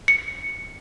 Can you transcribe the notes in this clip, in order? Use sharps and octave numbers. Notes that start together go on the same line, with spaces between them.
C#7